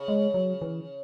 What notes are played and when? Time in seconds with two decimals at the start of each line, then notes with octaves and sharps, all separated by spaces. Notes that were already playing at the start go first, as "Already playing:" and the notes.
Already playing: C#3
0.08 G#3
0.34 F#3
0.62 E3